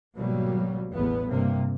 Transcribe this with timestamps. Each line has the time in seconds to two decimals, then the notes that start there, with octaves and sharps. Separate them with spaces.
0.18 G#1 B2 F#3 G3 A#3
0.92 A1 E2 B3
1.28 G2 C3 A#3